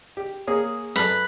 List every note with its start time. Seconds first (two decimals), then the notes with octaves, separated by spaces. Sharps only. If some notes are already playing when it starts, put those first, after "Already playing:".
0.17 G4
0.47 A#3 G#4 C#5
0.96 F#2 A4 B4 D5